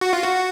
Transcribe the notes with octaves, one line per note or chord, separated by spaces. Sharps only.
F#4
F4
F#4